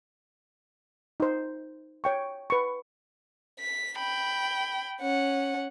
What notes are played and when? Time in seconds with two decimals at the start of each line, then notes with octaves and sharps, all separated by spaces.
1.20 D#4 C5
2.04 C#5 G5 C#6
2.50 B4 C#6
3.59 B6
3.98 G5 B5
5.01 C#4 F#5